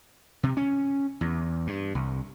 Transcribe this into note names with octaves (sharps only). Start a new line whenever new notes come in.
C3
C#4
E2
G2
C2